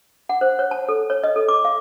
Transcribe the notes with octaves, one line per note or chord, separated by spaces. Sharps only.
F#5
C5
C#5
A5
A4
C#5
D#5
A4
D6
F5